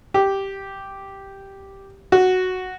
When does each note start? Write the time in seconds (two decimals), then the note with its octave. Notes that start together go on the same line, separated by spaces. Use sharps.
0.14 G4
2.12 F#4